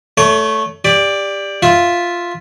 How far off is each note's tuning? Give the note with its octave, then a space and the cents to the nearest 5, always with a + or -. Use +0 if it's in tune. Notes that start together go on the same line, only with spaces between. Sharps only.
A3 +0 C#5 +30
G4 +25 D5 +0
F4 +0 E5 +0